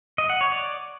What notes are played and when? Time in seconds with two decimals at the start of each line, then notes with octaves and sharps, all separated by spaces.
0.18 D#5
0.30 F#5
0.41 C#5
0.52 D5